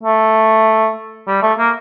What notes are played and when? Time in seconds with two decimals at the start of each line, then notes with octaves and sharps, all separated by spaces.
0.03 A3
1.27 G3
1.42 A3
1.58 A#3